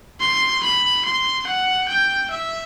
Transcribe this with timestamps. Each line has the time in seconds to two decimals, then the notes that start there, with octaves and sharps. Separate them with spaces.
0.21 C6
0.64 B5
1.05 C6
1.47 F#5
1.88 G5
2.31 E5